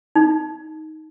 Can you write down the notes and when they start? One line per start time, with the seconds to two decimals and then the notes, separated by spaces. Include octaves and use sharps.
0.16 D#4